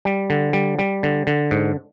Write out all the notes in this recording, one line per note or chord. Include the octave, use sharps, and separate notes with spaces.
G3
D3
G3
G3
D3
D3
G#2